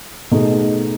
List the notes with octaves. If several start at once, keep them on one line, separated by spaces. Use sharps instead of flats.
B2 A3 D#4 G#4